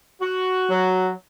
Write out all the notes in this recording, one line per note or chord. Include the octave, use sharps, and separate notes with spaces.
F#4
F#3